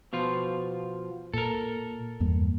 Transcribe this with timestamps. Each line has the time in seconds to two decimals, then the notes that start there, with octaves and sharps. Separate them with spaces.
0.13 B2 F3 F4
1.34 A#2 A4 A#4
2.20 E2 G2 A#3